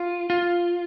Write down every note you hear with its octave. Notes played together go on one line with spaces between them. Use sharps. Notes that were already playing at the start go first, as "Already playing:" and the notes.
Already playing: F4
F4